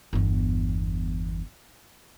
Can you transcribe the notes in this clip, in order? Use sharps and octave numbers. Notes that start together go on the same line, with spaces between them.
G1 E2